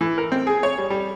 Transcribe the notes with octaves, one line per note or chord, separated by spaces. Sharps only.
E3
A#4
C4
G#4
C#5
G3
G3